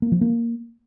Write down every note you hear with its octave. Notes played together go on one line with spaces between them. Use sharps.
A#3
F3
A#3